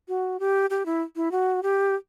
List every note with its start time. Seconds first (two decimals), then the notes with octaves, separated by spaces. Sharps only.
0.08 F#4
0.40 G4
0.70 G4
0.86 E4
1.16 E4
1.31 F#4
1.63 G4